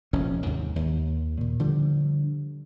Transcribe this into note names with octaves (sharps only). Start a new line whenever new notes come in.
F1 A#1 F3 C#4
D#2 G#2 C3
D#2
A#2
D3 F3 G3